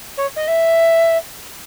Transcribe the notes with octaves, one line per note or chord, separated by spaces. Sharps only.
C#5
D#5
E5